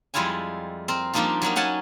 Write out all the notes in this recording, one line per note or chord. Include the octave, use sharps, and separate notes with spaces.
F2 G3 G#3 E4 F4 G#5
C4 A#4
F3 G3 A#3 D4 D#4 F4
F#3 G3 A#3 D#4
A#3 C#4 F#5 G#5 A5